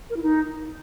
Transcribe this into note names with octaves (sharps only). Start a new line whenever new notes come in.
A#4
E4
D#4